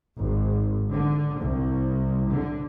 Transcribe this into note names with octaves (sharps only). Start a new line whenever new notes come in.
G#1
D3
C2
D3